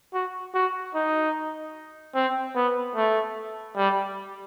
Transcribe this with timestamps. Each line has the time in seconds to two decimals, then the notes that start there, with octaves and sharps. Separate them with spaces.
0.14 F#4
0.54 F#4
0.95 D#4
2.15 C4
2.56 B3
2.96 A3
3.76 G3